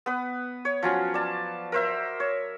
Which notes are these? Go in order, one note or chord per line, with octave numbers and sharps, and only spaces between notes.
B3 B4 D#6
C#5
F3 F#3 C#4
D5 A5
A#4 C5 E5
C#5